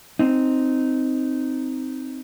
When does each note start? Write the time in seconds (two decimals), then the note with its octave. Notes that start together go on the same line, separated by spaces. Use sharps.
0.19 C4 D#4